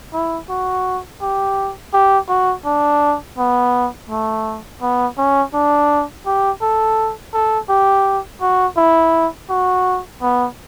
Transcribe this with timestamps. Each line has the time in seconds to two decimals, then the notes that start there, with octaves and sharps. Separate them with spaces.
0.14 E4
0.50 F#4
1.22 G4
1.94 G4
2.29 F#4
2.65 D4
3.38 B3
4.10 A3
4.82 B3
5.18 C#4
5.54 D4
6.26 G4
6.62 A4
7.34 A4
7.69 G4
8.42 F#4
8.77 E4
9.50 F#4
10.22 B3